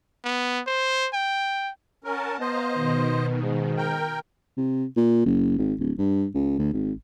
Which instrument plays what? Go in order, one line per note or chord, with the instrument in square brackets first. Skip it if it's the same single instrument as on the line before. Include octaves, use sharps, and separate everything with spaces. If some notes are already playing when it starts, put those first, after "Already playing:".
[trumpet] B3
C5
G5
[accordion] C#4 A#4 [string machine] F#5 A5
[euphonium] B3 [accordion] C5 D#5 [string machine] F5 A#5
[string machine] B2 D#3
[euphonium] G#2
[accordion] A#4 G5
[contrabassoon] C3
A#2
F#1
G#1
D1
G2
C#2
D2
G#1